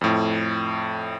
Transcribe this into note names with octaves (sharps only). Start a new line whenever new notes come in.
F2 A2